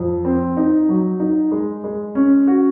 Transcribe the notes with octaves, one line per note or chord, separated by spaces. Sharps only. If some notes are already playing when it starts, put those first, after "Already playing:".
Already playing: F2
C4
D#4
F#3
D#4
G#3
G#3
C#4
F#4